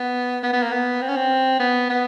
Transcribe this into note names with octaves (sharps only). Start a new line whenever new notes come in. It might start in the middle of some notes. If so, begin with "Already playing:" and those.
Already playing: B3
B3
B3
A#3
B3
C4
C#4
C4
B3
B3